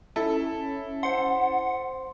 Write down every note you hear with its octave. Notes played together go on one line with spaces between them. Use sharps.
C#4 E4 A4
C5 F#5 C6